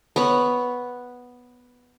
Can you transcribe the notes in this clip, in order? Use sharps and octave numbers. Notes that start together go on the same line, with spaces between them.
B3 C#5 F#5